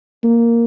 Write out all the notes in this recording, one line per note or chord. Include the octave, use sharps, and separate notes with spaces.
A#3